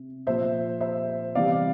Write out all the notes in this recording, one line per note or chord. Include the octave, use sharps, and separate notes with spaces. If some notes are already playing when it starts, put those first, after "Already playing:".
Already playing: C3
A#2 F3 C5 E5
C5 E5
C3 E3 G3 D5 F5